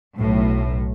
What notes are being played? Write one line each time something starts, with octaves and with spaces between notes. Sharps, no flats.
B1 A2